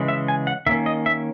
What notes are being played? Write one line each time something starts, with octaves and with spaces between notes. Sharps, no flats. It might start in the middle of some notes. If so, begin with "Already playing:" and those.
Already playing: C#3 E3 G#3
E5
G#5
F#5
D#3 A#3 C#4 E5
D#5
E5